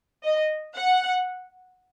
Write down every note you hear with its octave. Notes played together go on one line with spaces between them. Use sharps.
D#5
F#5